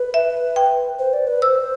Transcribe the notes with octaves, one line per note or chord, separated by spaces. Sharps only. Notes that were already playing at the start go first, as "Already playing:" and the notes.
Already playing: B4
E5
G5
C5
D5
B4
C5 E6